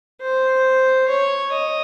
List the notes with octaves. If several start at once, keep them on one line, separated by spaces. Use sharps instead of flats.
C5
C#5
D#5